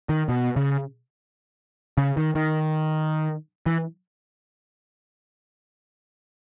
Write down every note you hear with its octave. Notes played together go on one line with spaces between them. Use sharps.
D#3
B2
C#3
C#3
D#3
D#3
E3